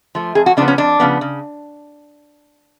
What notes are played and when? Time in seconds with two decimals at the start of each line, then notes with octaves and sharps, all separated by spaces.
0.15 F3 A3
0.35 F2 G#4
0.46 F#4
0.57 C#3 F3 B3 D4
0.68 C#4
0.78 F2 D4
1.00 C#3 F3 B3
1.21 C#3